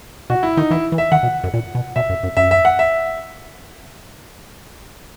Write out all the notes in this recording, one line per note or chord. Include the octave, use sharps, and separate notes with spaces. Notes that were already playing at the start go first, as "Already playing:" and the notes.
B2 F#4
E4
D#3 D#4
E3 E4
E3
E5
D#3 F#5
B2
F#2
A#2
B2
B2 E5
F#2
F#2
F#2 E5
E5
F#5
E5